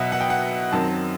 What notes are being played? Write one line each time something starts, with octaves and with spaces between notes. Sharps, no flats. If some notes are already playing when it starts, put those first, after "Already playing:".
Already playing: B2 F#3 B3 E5 F#5
F#5
G5
F#5
F#2 D#3 F#3 C4 A5